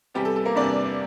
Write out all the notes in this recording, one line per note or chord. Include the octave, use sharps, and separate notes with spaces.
E2 C3 G3 G4
A4
A4
A#3 A#4
E2 C3 G3 D4 D5